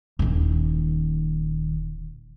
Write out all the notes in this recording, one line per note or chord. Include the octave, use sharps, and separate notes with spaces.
D#1 D#3